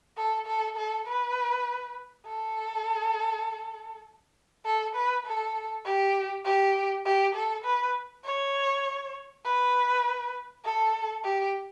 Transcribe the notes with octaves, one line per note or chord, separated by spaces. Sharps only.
A4
A4
A4
B4
A4
A4
B4
A4
G4
G4
G4
A4
B4
C#5
B4
A4
G4